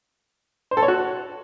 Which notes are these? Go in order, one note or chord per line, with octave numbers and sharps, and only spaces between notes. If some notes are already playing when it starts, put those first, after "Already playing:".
C5
A4
C#5
F#4